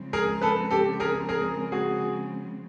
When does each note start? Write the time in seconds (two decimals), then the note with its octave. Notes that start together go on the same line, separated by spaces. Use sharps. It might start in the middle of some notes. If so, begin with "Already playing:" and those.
Already playing: C#3 F3 G#3 C4
0.13 G#4 A#4
0.41 A4 B4
0.70 G4 A4
1.00 G#4 A#4
1.29 G#4 A#4
1.72 F#4 G#4